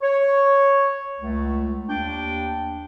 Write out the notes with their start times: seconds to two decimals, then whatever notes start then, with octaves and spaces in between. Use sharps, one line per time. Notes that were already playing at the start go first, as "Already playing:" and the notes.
0.01 C#5
1.20 C#2 A3
1.89 D#2 D4 G5